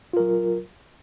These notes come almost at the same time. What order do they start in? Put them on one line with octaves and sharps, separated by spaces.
F4 A#4 F#3